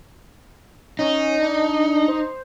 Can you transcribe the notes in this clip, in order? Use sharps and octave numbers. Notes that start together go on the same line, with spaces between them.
C#4 D#4
D4
C5